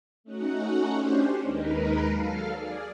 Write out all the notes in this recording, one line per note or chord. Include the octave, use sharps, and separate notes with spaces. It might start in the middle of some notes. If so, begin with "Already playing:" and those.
A3 C#4 D#4 F#4 F#5
C#4 D4 G4 C5
D#2 G#3 D#4 A#4 B4
F#3 A4 F5 F6
G#4 D5